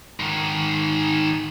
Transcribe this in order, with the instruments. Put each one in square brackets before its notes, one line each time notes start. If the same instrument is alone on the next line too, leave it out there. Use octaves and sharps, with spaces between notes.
[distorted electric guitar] G#2 D#3